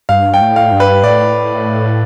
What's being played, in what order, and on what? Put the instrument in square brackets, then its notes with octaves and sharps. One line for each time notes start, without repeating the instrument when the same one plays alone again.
[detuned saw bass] G2 [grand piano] F5
[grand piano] G5
[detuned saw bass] A2
[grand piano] F5
[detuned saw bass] G2
[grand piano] B4
[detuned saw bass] A2 [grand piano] D5